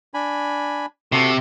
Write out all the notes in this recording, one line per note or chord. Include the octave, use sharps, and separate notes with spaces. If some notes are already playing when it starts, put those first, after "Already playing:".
D4 G#5 B5
C3 F#4 A4